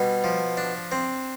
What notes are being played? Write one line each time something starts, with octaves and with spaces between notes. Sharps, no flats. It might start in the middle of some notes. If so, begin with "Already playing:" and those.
Already playing: B2 G3
F3
D4
C4